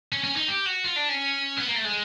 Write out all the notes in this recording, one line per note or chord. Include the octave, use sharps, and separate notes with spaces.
C#4
C#4
D#4
G4
F#4
F4
D4
C#4
B3
A#3
A3
G#3